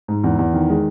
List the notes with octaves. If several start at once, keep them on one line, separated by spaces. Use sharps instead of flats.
G#2
E2
E2
D#3
G#3